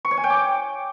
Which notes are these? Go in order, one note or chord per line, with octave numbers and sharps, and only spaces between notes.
C#6
C#5
G#5
G5
D6